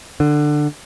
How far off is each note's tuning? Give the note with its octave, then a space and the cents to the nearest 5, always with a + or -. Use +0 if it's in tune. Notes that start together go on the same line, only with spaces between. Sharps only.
D3 +15